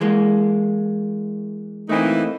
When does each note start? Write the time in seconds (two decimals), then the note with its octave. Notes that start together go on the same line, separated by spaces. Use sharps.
0.01 E3 G#3 A#3
1.89 E3 A3 A#3 C4 D#4